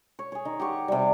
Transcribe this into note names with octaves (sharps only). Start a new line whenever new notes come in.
C#5
G#4 C#5
D#3
G4 F#5 C#6
C3 G3